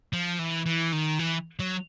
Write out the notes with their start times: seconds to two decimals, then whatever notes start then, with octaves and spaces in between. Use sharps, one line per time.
0.13 F3
0.39 E3
0.66 E3
0.93 D#3
1.19 E3
1.59 F#3